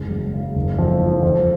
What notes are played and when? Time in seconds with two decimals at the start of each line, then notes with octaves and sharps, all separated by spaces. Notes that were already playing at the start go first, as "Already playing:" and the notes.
Already playing: F#1 G#3
0.10 F#2
0.34 C#3
0.55 F#1
0.78 F2
1.01 F3
1.23 F2